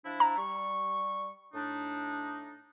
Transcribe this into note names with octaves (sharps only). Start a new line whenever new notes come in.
F3 D4 E4
A#5
G3 C#6
A2 D4 D#4